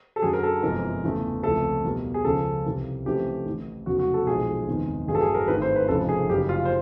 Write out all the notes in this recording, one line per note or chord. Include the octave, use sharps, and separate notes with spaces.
A4
F#2 D3 F#3 G#4
A#4
A4
G1 F2 C3 E3 G#3 A#4
E2 C#3 E3 A3
C#2 C3 F3 A3 A4
E2 B2 G3 A#3
G#4
C#2 C#3 F3 A#3 C#4 A4
C2 C3 E3 G3 A#3
F2 C#3 E3 A3 C4 G4
A1 A2 E3
F1 E2 C#3 F#3 F#4
F#4
A4
B1 A#2 F3 G#3 G#4
F#1 E2 C3 D#3 G#3
A1 G2 D3 F#3 G#4
A4
G#4
A#4
G#1 G#2 E3 A3 C4 B4
C5
B4
F1 F2 C#3 F3 A4
G#4
F#1 F#2 C#3 G4
F4
C5